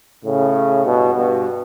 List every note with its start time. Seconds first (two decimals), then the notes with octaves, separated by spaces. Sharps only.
0.24 A2 C#3
0.84 G2 B2
1.14 G2 B2